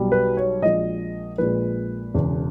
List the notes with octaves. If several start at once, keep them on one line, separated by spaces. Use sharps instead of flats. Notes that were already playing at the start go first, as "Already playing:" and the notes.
Already playing: B1 B2 G3
B4
C#5
A#1 A#2 G#3 D#5
A#1 A#2 G#3 B4
E1 E2 C#3